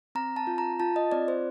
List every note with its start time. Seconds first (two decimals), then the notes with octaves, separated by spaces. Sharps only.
0.15 C4 A#5
0.36 A5
0.47 F4
0.58 A#5
0.80 F4 A5
0.96 D#5
1.12 C4 D5
1.28 C5